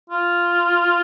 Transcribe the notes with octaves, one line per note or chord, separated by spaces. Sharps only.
F4